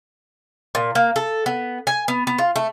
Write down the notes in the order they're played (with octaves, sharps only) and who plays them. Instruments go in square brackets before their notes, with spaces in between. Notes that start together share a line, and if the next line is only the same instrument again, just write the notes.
[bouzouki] A#2
A#3
A4
B3
G#5
B3
B3
F4
A3